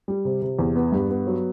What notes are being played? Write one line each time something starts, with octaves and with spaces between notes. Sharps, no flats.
G3
C3
C3
E2
B3
G2
B3
F#3